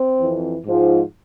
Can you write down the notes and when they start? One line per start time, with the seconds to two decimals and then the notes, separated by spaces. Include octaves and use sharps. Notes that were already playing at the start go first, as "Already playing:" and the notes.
Already playing: C4
0.19 F2 E3
0.64 G#2 F3